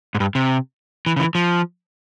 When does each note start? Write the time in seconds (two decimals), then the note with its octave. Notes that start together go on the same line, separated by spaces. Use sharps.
0.15 G#2
0.20 G2
0.35 C3
1.06 E3
1.17 C#3
1.20 E3
1.35 F3